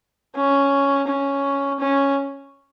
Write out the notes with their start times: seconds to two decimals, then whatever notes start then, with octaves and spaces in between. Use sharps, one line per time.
0.36 C#4
1.07 C#4
1.80 C#4